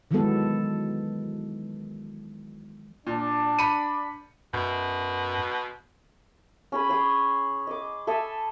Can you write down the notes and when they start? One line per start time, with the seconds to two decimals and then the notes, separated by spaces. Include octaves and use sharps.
0.11 D#3 E3 F#3 G#3 B3 A4
3.07 A#2 D4
3.59 B5 C#7 D#7
4.54 F#2 B2
6.72 C#4 G#4 B5
6.89 G#4 C#5
7.67 D#5 D6
8.07 A4 E5 G#5 D#6